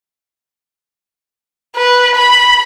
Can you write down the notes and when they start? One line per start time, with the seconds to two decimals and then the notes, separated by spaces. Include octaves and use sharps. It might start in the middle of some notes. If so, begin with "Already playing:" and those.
1.76 B4
2.15 B5